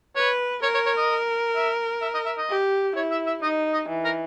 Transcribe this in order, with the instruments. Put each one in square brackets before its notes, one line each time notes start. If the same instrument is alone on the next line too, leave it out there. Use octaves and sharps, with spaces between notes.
[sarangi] B4 [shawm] C#5
[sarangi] A#4 [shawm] C#5
[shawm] C#5
C#5
D#5
E5
E5
D#5
E5
D#5
[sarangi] G4
[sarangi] E4 [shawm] C#5
[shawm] E5
E5
[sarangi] D#4 [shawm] D#5
[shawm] D#5
[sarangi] E3
[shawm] A#4